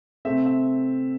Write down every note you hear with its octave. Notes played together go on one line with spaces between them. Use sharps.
C3 A3 C4 E5
E5